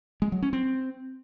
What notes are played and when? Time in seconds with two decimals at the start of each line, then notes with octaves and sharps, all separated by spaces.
0.22 G#3
0.32 F#3
0.42 C#4
0.53 C4